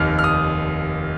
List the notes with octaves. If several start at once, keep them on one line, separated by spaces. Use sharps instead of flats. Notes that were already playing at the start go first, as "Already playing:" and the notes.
Already playing: F1 D#2 D#3 F6
F6
D#6